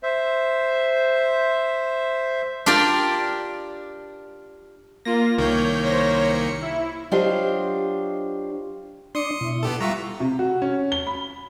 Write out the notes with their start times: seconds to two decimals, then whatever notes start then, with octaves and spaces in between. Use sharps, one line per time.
0.03 C5 E5
2.66 D4 F4 G4 A#4 D5
5.05 A#3 F4 A#6
5.38 C2 D#3 A#3 C#5 G6
5.85 C5 C#5 A#6
6.23 C#7
6.62 E4
7.11 F#3 D4 F4 G4 C5 D#5
9.15 D4 D5 C6 D#6 C#7
9.41 B2 E4
9.63 B3 G4 A4
9.80 G3 F4 E5 F#5 A#5 C#6
10.20 C3
10.39 F#4
10.62 C#4
10.92 G7
11.07 B5